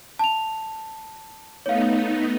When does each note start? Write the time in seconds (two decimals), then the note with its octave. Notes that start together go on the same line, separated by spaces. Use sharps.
0.19 A5 F7
1.66 A3 B3 D#4 C#5 F5